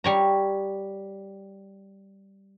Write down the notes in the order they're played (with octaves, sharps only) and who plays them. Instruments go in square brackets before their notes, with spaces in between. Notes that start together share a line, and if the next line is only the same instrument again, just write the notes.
[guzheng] G3 C#5 A#5